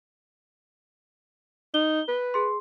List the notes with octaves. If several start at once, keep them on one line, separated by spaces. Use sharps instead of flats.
D#4 G7
B4
G#4 C6